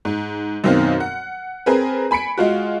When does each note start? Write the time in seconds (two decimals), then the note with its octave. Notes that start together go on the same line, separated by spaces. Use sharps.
0.05 G#2
0.64 F#2 B2 D#3 C4 F5 F6
1.00 F#5
1.66 C4 G#4 A#4 B4
2.11 G#5 B5 B6 C#7 D7
2.38 G#3 F4 F#4